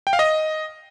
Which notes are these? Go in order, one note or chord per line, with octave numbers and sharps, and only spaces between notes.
G5
F5
D#5